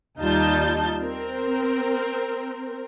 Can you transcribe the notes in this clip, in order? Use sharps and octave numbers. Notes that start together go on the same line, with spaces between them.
D#2 G3 D#4 F4 A5 G6
C4 A#4